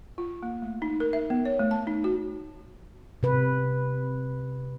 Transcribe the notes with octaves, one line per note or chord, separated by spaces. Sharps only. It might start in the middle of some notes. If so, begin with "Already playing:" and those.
F4
A#3
A3
D#4
A#4
E5
B3
C#5
A3
A5
D#4
F#4
C3 B4